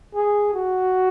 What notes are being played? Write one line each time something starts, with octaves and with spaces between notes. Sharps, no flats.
G#4
F#4